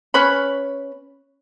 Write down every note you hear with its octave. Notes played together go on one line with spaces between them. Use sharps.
C#4 B4 C#5 B5